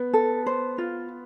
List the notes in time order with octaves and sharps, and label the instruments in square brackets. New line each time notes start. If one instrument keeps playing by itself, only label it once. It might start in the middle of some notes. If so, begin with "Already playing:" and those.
Already playing: [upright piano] B3
[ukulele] A4
C5
F4